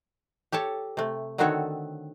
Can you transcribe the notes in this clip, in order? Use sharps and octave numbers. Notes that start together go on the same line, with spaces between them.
G4 A4 C#5 A5
C3 A3
D3 D#3 C4 F#4 A4 C#5